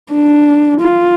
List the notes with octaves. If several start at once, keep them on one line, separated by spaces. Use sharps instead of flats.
D4
F4